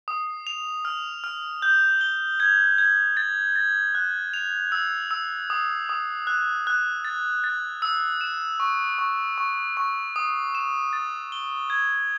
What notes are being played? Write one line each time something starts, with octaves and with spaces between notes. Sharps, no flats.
D#6
F7
F6
F6
G6
G7
G#6
G#6
A6
A6
F#6
F7
E6
E6
D#6
D#6
F#6
F#6
A6
A6
E6
E7
C#6
C#6
C#6
C#6
D#6
E7
A6
G7
G#6